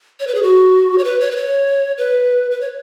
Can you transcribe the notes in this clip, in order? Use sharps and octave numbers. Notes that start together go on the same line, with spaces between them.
C#5
B4
G#4
F#4
C#5
B4
C#5
B4
C#5
B4
B4
C#5